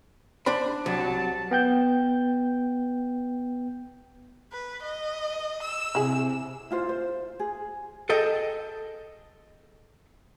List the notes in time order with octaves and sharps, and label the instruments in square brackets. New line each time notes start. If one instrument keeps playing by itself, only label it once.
[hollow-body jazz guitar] D4 C5 B5
[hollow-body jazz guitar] C2 [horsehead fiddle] F#3 A5
[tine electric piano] B3 G5 G6
[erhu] B4
D#5
E6
[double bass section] C3 [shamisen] E4 G#4
[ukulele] E4 F4 C5 F5
C5
G#4
[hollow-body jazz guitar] G#4 A4 D#5 G5